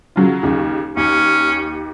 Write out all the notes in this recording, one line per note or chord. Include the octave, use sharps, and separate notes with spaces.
C#3 F#3 F4
D#2 C#3
D#2 C#4